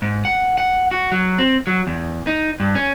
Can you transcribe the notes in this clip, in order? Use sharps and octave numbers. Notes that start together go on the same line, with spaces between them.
G#2
F#5
F#5
F#4
F#3
C4
F#3
E2
D#4
G2
C#4